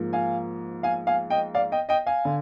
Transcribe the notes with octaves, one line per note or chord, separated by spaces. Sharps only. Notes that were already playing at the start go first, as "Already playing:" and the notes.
Already playing: G#2 F3 A#3
F5 G#5
F5 G#5
F5 G#5
D#5 G5
D5 F5
D#5 G5
D#5 G5
F5 G#5
D3